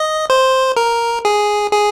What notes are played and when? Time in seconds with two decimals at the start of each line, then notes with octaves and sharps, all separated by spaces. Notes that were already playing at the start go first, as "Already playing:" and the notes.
Already playing: D#5
0.30 C5
0.77 A#4
1.25 G#4
1.72 G#4